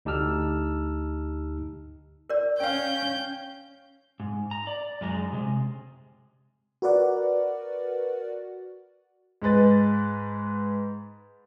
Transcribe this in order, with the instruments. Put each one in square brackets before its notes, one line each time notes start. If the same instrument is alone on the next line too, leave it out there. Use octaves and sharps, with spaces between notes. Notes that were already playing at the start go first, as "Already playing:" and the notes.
[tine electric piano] D2 D#4 G4 A5 E6 F6
[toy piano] A#4 D5
[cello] C#4 [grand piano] F5 G5 [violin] G6
[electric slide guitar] G#2
A#5
D5
F#2 G#3 A#5
C3 G#3
[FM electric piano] F#4 A#4 B4 D5 F#5
[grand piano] G#2 G#3 B4 A6